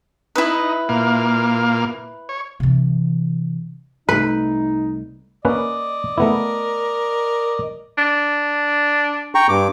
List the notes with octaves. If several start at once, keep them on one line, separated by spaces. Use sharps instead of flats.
D#4 E4 B4
A#2 A#3 F5
C#5
C3 E3
C2 A3 D#4 B4
A#3 C#4 B4 D5 D#5
A3 B3 E4 A#4
D4
G5 A#5 C#6
G2 D6